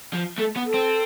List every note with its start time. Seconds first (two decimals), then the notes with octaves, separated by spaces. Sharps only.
0.14 F3
0.39 A3 A4
0.56 B3
0.66 A4
0.74 C4